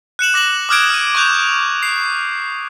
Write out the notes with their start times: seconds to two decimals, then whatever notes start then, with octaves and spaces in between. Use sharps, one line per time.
0.19 F#6 C#7 E7 F#7
0.34 D6 A#6 E7 F#7
0.69 D6 D#6 F6 F#6 G#6 D7
0.90 F6 D#7
1.15 C#6 D6 F#6 G6 F7
1.83 C7